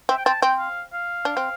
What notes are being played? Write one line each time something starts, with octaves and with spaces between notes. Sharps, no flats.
C4 E5
G5
C4 A5
C4 G5
F5
F5
D4
C4